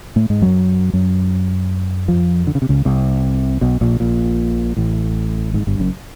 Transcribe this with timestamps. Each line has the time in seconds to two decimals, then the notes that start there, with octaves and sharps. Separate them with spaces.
0.16 A2 A3
0.30 G#2 G#3
0.41 F#2 F#3
0.93 F#2 F#3
2.08 F2 F3
2.47 D3
2.55 C#3
2.62 C3
2.69 C#2 C#3
2.85 C2 C3
3.61 B1 B2
3.81 A#1 A#2
4.00 A#1 A#2
4.77 A1 A2
5.54 G#1 G#2
5.67 G1 G2
5.79 F#1 F#2